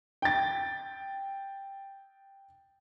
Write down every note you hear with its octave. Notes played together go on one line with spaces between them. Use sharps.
G5 A6